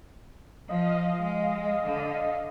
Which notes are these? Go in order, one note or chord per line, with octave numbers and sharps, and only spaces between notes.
F3 D#5 F5
G#3
D3